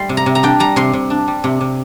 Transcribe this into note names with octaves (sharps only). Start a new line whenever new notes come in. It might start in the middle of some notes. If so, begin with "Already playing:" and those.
Already playing: G3 C6
C3
A#5
C3
A#5
D4 G5
G3 A#5
C3 C6
C3
D4
G3
C3
C3